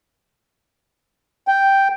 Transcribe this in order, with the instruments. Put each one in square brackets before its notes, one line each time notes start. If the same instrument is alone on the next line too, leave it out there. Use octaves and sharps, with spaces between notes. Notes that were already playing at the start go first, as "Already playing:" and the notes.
[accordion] G5